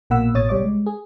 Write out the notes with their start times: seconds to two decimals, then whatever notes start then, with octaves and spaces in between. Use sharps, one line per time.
0.10 A#1 B2 A#3 F#5 B5 E6
0.34 A1 B2 C#5 D#6 A6
0.49 C2 G3 C#5 D6
0.64 G#3
0.86 G#4